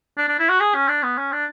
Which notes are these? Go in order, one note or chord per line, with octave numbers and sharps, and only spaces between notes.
D4
D4
E4
F#4
G#4
C#4
D4
B3
C#4
D4